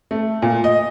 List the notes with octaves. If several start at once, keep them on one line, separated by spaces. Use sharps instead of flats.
A3
A#2
D#5